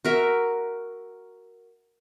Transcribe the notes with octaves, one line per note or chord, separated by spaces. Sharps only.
F#4 A#4 E5